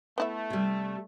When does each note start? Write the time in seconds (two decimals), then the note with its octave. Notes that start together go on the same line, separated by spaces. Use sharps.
0.18 A3 B3 E4 E5
0.50 C3 G3